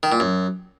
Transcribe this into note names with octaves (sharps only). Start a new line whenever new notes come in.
D#3
A#2
F#2